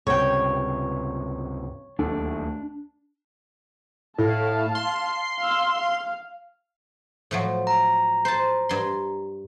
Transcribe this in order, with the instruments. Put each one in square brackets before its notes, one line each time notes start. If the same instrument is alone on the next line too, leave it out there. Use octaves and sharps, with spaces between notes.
[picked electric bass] C#2 G2 C3 [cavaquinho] C#5 G5
[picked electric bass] D1 D#2 A3 [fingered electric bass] D4
[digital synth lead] A2 [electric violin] F5 A5
[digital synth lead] C6
[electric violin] F5 E6
F5
[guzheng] A2 F3 F#3
[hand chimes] A#5
[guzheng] C5 A5
G2 C6